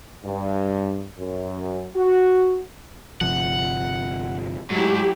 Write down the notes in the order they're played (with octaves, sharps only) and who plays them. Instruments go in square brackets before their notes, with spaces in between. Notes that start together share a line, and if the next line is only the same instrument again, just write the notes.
[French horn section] G2
F#2
F#4
[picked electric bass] G1 C3 F3 [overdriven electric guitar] F#5
[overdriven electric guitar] G#2 [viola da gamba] F#3 A3 E4 [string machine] G4